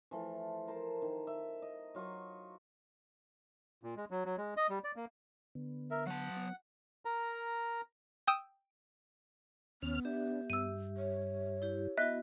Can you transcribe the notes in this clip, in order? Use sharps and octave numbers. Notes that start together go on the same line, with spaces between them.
E3 F3 A3
A#4 C5 A5
D#3
E5
D#5
F#3 F4 D#5 C#6
A#2
G#3
F#3
F#3
G#3
D#5
G3
D5
A#3
D3 B3
A#4 E5
F#3 F#5 A5
B3
A#4 A#5
G5 D#6 E6
D#2 B3 C#4 F6
D4 G4 E5
G2 E6 D#7
C#5
E4 G4
B3 E4 F#4 D#5 E5 F#6